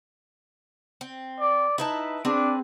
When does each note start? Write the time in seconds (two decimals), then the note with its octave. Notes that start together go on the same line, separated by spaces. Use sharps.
1.01 C4
1.39 D5
1.78 D#4 E4 B4 A5
2.25 C4 D4 G#4 B4